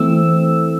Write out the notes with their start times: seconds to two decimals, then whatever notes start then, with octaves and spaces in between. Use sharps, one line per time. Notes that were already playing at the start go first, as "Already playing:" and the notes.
Already playing: E3 A3 C4 E6